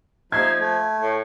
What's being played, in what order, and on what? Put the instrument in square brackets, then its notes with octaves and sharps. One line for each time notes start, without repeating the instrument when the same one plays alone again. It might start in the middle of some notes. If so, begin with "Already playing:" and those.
[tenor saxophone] F3 [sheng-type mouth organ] D#4 E5 C6 [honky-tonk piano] G#6
[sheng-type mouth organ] A3
[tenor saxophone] A2